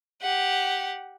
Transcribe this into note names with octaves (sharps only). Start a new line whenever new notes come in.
G4 F#5